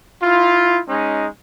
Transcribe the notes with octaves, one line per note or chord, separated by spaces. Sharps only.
E4 F4
G#3 C#4 D#4